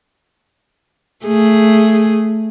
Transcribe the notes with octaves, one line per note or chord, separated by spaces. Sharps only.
A3 G#4